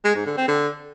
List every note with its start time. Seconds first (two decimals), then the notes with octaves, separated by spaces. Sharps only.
0.04 G#3
0.15 G#2
0.26 D3
0.37 C4
0.48 D3